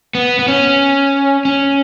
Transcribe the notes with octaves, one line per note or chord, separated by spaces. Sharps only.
B3
B3
C#4
C#4